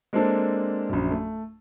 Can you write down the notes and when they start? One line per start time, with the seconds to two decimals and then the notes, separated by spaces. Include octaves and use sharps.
0.13 G#3 A#3 C4 D4 A4
0.89 A#1 F#2
1.11 A3